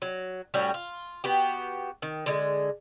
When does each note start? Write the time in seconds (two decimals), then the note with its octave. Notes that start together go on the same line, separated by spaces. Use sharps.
0.02 F#3
0.54 A2 G3 C#4 F#4
0.74 F4
1.24 B3 F#4 G4
2.02 D#3
2.26 D3 G#3